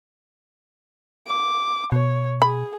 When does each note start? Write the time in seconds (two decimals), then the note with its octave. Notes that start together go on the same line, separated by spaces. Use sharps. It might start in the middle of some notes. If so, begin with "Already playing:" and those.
1.27 D6
1.92 B2 C#5
2.42 G#4 B5